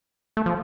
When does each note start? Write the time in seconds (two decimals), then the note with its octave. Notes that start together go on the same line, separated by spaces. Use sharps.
0.37 A3
0.46 F3